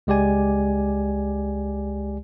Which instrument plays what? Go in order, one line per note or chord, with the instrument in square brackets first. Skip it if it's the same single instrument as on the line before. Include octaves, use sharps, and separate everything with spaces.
[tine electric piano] C#2 G#3 G4 D5 G#5